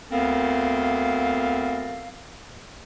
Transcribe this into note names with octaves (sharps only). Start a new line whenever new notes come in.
D2 B3 C4 A4 A#4 F5